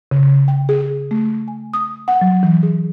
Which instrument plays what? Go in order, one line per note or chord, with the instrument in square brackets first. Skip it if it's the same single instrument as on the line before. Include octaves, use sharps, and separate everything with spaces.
[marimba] C#3
G5
G#4
A3
G#5
D#6
F#5
F#3
E3
G#4